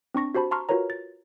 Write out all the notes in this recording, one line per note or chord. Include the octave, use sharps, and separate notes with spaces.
C4 D4 C#6 A#6
F#4 G4 C5 A5 B5
A5 A#5 C6 C#6 F6
F4 F#4 A#4 B4 C#5 A#5
A6